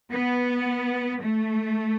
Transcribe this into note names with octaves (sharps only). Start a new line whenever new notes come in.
B3
A3